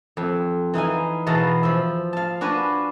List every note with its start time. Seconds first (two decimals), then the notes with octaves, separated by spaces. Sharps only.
0.17 F2
0.74 E3 D#4 F5 G#5
1.27 E2 B2 F5 A5 A#5
1.63 F3 E5
2.13 F5 A5
2.41 D4 F#4 B4 F5 G#5